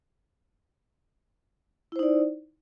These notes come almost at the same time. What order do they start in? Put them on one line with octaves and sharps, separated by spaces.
E4 C5 D#4 D5